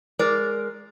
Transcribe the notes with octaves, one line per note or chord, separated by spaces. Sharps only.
G#3 A#4 D5